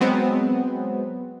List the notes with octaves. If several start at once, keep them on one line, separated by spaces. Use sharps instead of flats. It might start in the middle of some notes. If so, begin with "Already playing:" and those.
F#3 G#3 B3 C4